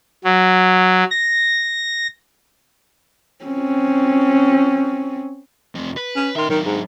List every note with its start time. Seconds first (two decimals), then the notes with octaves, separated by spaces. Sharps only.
0.24 F#3
1.11 A#6
3.45 C4 C#4
5.75 F2 C3
5.97 B4
6.16 C#4
6.36 D#3 E5 C6
6.50 D#3 F#3 D4
6.66 G#2